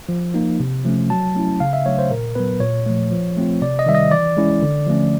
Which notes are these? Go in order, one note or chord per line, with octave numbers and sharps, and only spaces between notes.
F3
A#3 D#4
C3
F3 A3 C#4
F#3 A5
A3 C#4 E4
C#3 F5
E5
F#3 A3 D4 C#5
C5
A#2 A#4
F#3 B3 B4
A#2 C#5
F3 A3
F3
A3 C4 F4
C3 D5
D#5
D#3 G3 E5
D#5
E3 D5
G#3 C#4 E4
D3
F3 A3 C#4